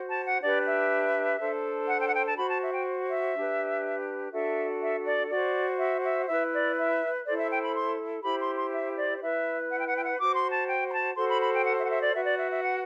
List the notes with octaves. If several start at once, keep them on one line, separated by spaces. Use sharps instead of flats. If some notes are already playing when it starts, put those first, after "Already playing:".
Already playing: F#4 C5
A5
F#5
D4 G4 B4 D5
E5
D4 A4 C5
F#5
G5
F#5
G5
A5
F#4 C5 B5
A5
E5
G5
E5
D4 G4 B4
D4 F#4 A4 E5
E5
D5
F#4 C5 D5
E5
E5
E4 B4 E5
D5
E5
E4 A4 C5 D5
E5
G5
B5
C6
E4 G4 C5 B5
C6
C6
E5
D5
E4 B4 E5
F#5
G5
F#5
G5
F#5
F#4 C5 D6
C6
A5
G5
B5
A5
F#4 A4 C5 C6
B5
B5
G5
F#5
E5
F#5
E5
D5
F#4 B4 E5
D5
E5
E5
F#5